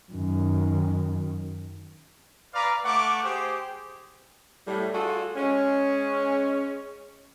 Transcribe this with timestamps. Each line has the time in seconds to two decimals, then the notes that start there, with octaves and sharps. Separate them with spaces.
0.12 F#2 D#3
2.54 B4 D5 F5 A#5 D6
2.85 A3 F#5 C#6 D6
3.23 G4 G#4 C5
4.67 A2 G3
4.94 D4 F4 F#4 G#4 A4
5.36 G#3 C#4